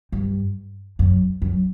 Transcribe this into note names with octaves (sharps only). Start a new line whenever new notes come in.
G2
F#2
F#2